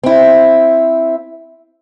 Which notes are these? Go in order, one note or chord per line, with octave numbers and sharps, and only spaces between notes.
C4 E4